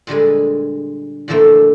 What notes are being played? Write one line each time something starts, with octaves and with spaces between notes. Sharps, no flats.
A#2 D3 G3 G#3
A#2 D3 E3 F3 A3 A#3